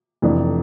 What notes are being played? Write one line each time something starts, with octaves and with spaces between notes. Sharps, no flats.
F1 F2 E3 A3 D4